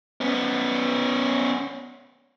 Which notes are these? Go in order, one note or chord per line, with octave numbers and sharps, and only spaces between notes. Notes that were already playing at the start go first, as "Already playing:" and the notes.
B3 C#4